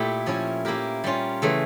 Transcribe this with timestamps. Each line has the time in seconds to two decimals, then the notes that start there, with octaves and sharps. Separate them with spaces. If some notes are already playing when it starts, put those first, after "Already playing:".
Already playing: A#2 A3 E4 G4
0.26 F3 C#4 E4
0.65 A#3 E4 G4 A#4
1.04 G3 A#3 C#4 F4
1.42 C#3 E3 A3